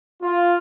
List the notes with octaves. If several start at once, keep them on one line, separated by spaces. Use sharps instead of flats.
F4